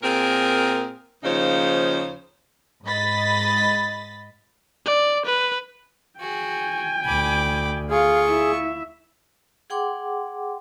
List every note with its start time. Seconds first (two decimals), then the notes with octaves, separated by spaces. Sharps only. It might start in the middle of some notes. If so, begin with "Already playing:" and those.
0.03 A#2 C4 G#4 A#4
1.24 D#2 C#3 F3 D#4 C5 C#5
2.85 G#2 D#5 B5 A6 B6
4.86 D5
5.26 B4
6.20 F#4 G#4 G5 G#5
7.06 D2 B5 D6
7.90 F4 G#4 F5 C#6
8.26 E4 E5
9.70 G#4 F#5 G5 C6 D6